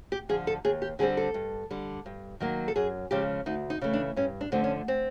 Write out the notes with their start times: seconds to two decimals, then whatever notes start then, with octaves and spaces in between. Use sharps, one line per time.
0.12 G4
0.29 D3 F3 G#4
0.47 A4
0.65 D#2 G#4
0.82 G4
0.99 D3 G3 C4 G#4
1.17 A4
1.34 G2
1.71 D3 G3
2.06 G2
2.40 D#3 F#3 A#3
2.68 A4
2.76 F#2 G#4
3.11 C#3 F3 G#3 G4
3.46 D2 D#4
3.70 D#4
3.81 C#3 E3 A3
3.93 D4
4.16 G2 C#4
4.41 D4
4.52 D3 F3 A3 C4
4.64 C#4
4.88 C4